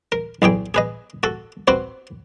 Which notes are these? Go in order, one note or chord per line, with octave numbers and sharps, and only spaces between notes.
A#4
B1 E2 G#4 G5
G#4 B4 D#5
F#4 A4
C4 F#4 B4 C5